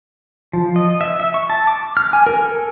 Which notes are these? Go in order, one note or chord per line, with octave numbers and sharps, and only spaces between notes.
F3
D#5
E5
E5
C#6
A5
D6
F6
G#5
A#4
A4